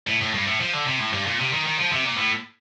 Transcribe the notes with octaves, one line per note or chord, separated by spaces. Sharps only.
A2
A2
G2
A2
F3
D3
C3
A2
G2
A#2
C3
D#3
D#3
F3
C3
A#2
A2